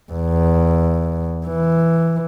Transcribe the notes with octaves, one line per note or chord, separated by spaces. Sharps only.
E2
E3